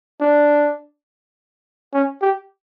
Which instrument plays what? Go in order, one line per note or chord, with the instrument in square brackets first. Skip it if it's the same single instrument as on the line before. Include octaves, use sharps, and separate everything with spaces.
[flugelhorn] D4
C#4
G4